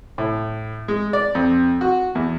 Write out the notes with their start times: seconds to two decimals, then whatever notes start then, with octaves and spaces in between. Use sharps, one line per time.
0.18 A2
0.88 G#3
1.13 D5
1.35 F2
1.81 F#4
2.15 E2